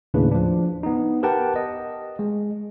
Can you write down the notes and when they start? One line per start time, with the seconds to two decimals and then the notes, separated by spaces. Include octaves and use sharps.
0.14 D#2 A2 C#3 D4 B4
0.32 F3 D4
0.83 B3 D#4
1.23 G4 A#4 B4 F#5 G5 A5
1.56 D#5
2.19 G#3